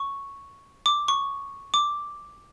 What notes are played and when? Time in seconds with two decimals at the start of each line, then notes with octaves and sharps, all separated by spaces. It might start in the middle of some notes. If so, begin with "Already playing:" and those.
Already playing: C#6
0.86 D6
1.08 C#6
1.74 D6